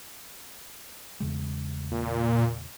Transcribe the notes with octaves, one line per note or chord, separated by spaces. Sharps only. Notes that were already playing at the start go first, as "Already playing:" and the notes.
E2 C#3 G#3
A#2